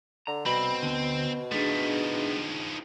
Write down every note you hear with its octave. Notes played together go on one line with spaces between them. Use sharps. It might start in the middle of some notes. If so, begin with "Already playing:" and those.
D3 A#5
C2 B2 C4 B5
D2 D3 B3
D#3 F3 A3 D4 D#4 G#4